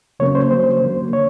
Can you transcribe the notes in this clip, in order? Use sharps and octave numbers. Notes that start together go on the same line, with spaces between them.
C#3 F#3 A#3 C#4 C#5
C5
D3 F#3 A#3 C5
D3 F#3 A#3
D3 C#5